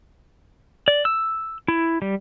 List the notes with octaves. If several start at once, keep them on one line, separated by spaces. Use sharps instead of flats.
D5
E6
E4
G3